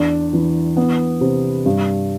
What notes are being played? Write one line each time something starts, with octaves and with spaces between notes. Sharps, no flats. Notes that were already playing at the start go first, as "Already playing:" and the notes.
Already playing: E2 D4
E3
B3
C3
G2